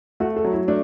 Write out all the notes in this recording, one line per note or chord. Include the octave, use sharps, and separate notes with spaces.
A3 F#4
A4
F#3
E4
A3 D4